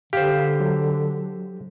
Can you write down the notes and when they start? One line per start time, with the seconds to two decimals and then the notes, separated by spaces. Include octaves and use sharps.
0.13 D3 G4 C5 F5
0.60 F#3